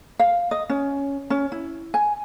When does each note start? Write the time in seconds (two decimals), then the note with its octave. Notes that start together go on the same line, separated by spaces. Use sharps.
0.19 F5
0.51 D#5
0.70 C#4
1.30 C#4
1.52 E4
1.94 G#5